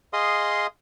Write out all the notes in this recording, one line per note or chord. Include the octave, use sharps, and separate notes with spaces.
G#4 D#5 F5 C6 D#6